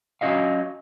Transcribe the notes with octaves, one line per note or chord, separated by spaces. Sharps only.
F#3 C#4 F#4 D#5 F5